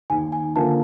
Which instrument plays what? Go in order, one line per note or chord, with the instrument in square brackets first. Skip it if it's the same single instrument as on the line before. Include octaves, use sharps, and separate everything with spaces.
[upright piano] D#2 [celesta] G#5
[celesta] G#5
[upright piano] D3 F3 A#3 [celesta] A5